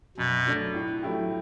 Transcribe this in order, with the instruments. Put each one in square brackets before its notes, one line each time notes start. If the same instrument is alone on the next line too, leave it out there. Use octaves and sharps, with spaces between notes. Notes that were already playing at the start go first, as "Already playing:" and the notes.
[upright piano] F#2 [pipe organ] B2
[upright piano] F#3 A3 D4
A2
F#3 A3 E4 G4